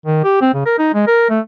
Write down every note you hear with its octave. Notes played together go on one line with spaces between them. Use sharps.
D#3
G4
C4
C#3
A#4
D#4
G#3
A#4
A3